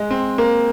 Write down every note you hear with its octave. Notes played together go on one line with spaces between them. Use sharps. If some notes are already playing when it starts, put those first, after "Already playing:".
Already playing: G#3
C4
A#3